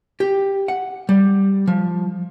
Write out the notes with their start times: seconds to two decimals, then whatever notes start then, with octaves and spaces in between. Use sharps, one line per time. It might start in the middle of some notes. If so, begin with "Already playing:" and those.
0.20 G4
0.68 F#5
1.09 G3
1.67 F3